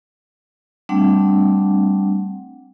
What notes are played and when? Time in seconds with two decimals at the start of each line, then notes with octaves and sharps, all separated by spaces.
0.89 G3 A3 C4 D4 F#5